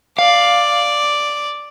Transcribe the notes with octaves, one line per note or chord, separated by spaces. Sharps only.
D5 F5